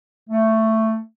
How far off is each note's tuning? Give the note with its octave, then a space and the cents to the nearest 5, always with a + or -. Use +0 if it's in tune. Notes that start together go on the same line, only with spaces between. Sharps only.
A3 +10